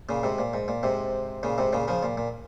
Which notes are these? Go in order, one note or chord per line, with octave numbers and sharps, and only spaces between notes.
A#2 C#3
G#2 C3
A#2
G#2
A#2
G#2 C3
A#2 C#3
G#2 C3
A#2 C#3
C#3 F3
A#2
A#2